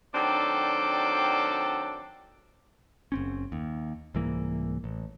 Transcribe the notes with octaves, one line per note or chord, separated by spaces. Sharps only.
D#3 F#3 C4 D4 A4 D5
F#1 C4 C#4
D#2
C2 G#2 E3 A#3
A1